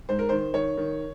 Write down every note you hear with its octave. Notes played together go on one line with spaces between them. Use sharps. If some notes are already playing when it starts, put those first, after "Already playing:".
G#2 C5
A#4
D#3 C5
D#3 C#5
D#3